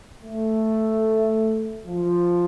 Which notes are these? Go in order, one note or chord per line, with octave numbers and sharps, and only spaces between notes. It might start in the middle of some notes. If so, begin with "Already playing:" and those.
A3
F3